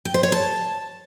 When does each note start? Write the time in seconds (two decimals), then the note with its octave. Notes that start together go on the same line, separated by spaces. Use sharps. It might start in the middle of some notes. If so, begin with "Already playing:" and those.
0.05 G5
0.14 C5
0.23 C#5
0.32 A5